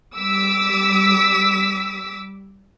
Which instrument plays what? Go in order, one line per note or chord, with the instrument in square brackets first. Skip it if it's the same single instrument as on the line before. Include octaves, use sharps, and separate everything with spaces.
[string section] G3 D6 E6 B6